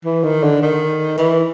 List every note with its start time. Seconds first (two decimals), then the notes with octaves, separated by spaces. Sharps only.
0.05 E3
0.24 D#3
0.43 D3
0.62 D#3
1.18 E3